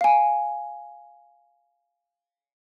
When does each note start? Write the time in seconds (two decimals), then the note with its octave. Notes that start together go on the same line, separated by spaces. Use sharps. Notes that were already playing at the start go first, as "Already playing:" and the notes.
0.01 F5 G#5